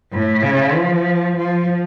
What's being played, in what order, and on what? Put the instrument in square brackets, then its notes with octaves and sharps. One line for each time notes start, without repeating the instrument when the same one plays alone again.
[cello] A2
C#3
F3
F3